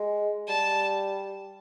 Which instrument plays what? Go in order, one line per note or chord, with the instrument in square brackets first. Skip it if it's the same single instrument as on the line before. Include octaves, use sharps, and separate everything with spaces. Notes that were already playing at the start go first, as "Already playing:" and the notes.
Already playing: [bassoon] G#3
[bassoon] G3 [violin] A5